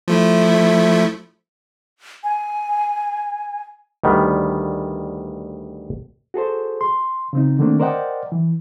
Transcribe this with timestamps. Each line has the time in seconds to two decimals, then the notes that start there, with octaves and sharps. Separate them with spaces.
0.08 F3 A3 E4
2.24 G#5
4.03 D2 D#3 G3 B3
6.34 F#4 G#4 A4 C5
6.81 C6
7.33 C#3 C4 D#4
7.59 D3 D#3 A3 A#3 C4 D4
7.80 A#4 C5 D5 D#5 F#5 G5
8.32 E3